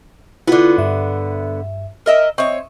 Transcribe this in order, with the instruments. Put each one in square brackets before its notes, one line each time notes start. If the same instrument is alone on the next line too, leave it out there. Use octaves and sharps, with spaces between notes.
[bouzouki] D3 B3 [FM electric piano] E4 F4
[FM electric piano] G2 E5
[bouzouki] A#4 D#5 E5
[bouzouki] C4 C#5 [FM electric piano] D#5 E5 C#6